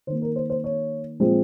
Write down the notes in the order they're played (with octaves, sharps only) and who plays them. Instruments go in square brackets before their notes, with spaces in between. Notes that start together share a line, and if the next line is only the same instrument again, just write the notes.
[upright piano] D#3 A#3 C5
A#4
C5
C5
C#5
A#2 F3 G#3 C4